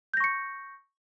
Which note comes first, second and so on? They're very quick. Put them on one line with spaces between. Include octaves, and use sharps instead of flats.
G6 A#6 C#6 C#7